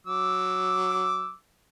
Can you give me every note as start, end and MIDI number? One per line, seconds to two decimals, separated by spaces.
0.07 1.33 54
0.07 1.33 86
0.07 1.33 88